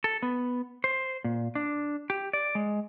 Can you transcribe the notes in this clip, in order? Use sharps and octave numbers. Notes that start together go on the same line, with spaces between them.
A4
B3
C5
A#2
D4
G4
D5
G#3